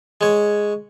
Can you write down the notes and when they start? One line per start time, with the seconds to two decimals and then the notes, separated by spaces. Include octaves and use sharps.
0.21 G#3 C#5